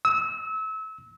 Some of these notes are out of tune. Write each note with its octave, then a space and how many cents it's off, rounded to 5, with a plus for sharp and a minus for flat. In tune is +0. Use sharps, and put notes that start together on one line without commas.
E6 -30